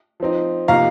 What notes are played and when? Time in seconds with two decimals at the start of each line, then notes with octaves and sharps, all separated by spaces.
0.20 F3 C4 D#4
0.68 C3 F3 A#3 D#4 F5 A#5